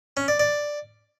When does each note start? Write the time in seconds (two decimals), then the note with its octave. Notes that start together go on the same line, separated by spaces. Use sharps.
0.17 C#4
0.28 D5
0.39 D5